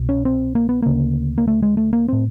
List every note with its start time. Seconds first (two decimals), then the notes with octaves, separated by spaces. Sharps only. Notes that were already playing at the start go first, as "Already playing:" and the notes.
Already playing: C2 B2
0.09 C#4
0.25 C4
0.55 A#3
0.69 B3
0.82 D2 C#3 A#3
1.38 A#3
1.48 A3
1.62 G#3
1.77 A3
1.93 A#3
2.08 A2 C4